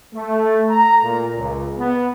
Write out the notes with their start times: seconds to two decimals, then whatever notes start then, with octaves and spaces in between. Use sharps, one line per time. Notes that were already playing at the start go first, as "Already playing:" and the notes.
0.14 A3
0.70 A#5
1.03 A#2
1.37 C#2
1.78 B3